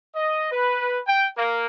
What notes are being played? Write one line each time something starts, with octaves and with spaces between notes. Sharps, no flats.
D#5
B4
G5
A#3